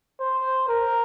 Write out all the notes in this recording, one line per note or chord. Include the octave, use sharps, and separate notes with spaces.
C5
A#4